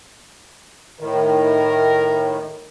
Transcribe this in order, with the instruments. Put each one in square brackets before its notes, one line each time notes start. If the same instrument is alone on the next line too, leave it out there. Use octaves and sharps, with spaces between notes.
[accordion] A2 D#3 [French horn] A#4